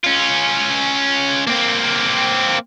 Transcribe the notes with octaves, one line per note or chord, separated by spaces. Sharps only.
C#4 F4
A#3 C4